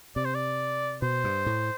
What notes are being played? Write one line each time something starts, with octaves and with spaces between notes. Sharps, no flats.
C3 D5
C5
D5
B2 C5
G2
A2